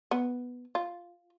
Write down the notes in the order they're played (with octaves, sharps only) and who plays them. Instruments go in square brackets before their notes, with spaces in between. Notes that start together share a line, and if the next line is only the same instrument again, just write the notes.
[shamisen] B3
F4